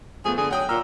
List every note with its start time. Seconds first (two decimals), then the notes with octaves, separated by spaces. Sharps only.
0.25 F3 A3 B3 G#4
0.38 D3 B3 G#4
0.51 F#3 F#5 G5 D#6
0.69 A#2 A#5 E6 F6